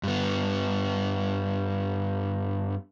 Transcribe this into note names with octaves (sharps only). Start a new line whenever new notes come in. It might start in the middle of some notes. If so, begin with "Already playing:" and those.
G2 B3